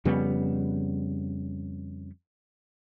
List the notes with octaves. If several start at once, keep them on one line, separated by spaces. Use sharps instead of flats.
F2 C#3 G3 B3